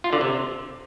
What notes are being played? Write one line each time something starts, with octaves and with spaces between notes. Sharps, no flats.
F4
D3
C3